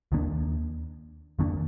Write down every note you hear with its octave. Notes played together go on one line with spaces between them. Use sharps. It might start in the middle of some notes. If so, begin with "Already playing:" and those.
D#2 D#3 A#3 D4
F2 D#3 A#3 D4